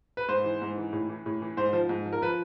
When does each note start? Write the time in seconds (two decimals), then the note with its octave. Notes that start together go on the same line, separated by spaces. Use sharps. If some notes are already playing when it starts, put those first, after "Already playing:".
0.17 B4
0.28 G#2 C5
0.44 E3
0.61 G#2
0.78 E3
0.93 A2
1.09 E3
1.26 A2
1.42 E3
1.57 G#2 C5
1.73 F3
1.89 G#2
2.06 F3
2.13 A#4
2.22 F3 B4